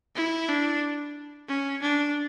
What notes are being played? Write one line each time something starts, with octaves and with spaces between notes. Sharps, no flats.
E4
D4
C#4
D4